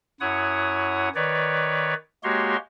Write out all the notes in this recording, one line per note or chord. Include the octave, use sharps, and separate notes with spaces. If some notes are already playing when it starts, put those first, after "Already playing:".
F#2 E4 C#5 F#5 D#6
D#3 B4 C#5 D5
G#3 A#3 F#4 G4 C#5 C6